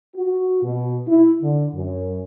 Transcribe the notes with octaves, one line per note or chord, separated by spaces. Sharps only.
F#4
B2
E4
D3
F#2